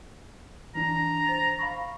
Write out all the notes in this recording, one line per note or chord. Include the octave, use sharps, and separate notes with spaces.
E3 D4 A#5
C5 A6
F5 B5 C#6